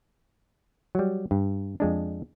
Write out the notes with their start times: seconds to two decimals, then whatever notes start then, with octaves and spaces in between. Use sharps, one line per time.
0.95 F#3 G3
1.31 G2
1.80 F2 G#3 D4